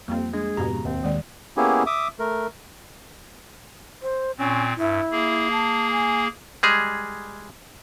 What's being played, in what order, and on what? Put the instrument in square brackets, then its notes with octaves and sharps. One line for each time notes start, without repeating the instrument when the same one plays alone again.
[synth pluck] F2 G3 F4 [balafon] A#3 [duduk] C4
[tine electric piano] G#3 [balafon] D4 [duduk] G#4
[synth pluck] F2 G#2 B2 [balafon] F#4 G4 [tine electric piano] A#5
[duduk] C#3
[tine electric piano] D#2 [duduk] C4
[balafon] D#3 G#3 D5
[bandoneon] A#3 B3 C#4 E4 G4 G#4
E5 D6 D#6
A3 A#4
[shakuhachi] C5
[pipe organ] A#2 C4 [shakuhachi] C#4
[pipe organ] G2 [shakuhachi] E4
[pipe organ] A#3 G#4
[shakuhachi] A5
G#5
[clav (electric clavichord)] G3 G#3 G#4